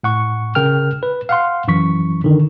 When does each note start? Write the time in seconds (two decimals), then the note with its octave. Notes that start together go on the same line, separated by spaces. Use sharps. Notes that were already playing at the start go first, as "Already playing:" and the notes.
0.03 A2 F#5 C#6
0.55 C#3 A#4 G5 F6
1.03 B4
1.29 F5 F#5 C6
1.68 F#2 E3 C#6 B6
2.24 D3 D#3